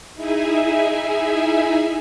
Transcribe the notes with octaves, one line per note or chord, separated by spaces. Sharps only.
D#4 E4 G#4 E5 G#5